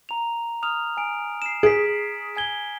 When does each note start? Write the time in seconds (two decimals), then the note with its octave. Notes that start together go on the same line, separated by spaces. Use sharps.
0.09 A#5 F7
0.63 D#6 F6 F7
0.97 G#5 D7
1.42 C7 E7
1.63 G#4 B6 D7
2.37 G#5 G#6 G7